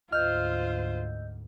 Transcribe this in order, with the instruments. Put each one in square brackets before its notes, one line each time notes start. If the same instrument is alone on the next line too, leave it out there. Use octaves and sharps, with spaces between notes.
[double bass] D2 G#2 [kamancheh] F4 C5 [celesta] D#5 E6 G6 [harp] F6